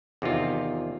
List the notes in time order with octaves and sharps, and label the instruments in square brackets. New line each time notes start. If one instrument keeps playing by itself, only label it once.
[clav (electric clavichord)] E2 C3 D#3 F4